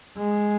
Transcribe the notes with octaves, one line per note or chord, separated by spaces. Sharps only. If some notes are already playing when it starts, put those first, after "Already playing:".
G#3